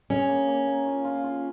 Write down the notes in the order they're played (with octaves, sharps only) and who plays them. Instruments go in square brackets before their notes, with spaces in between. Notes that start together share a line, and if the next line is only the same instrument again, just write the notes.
[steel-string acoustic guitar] C#4 [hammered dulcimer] G#4
[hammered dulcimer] A#3
A#3
A#3
F4
F4
F4